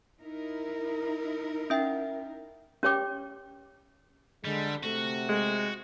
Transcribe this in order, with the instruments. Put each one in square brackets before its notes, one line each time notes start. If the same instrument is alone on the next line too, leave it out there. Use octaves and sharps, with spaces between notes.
[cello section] D#4 E4 A#4
[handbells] C#4 E5 G5
[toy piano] C#4 G4 C#5 G5 D6
[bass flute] D3 [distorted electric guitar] G3 [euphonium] G#3
[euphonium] C3 [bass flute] A3 [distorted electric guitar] F#4
[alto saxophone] G#3